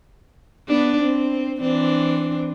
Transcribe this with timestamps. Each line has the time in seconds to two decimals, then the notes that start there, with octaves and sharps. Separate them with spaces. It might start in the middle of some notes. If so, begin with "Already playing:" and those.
0.67 B3 D4
1.02 C4
1.61 E3 C4 D4